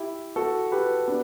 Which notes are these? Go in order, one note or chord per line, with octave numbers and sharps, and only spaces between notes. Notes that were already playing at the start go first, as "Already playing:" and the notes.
Already playing: E4 G4
F#4 A4
G4 B4
B3 D4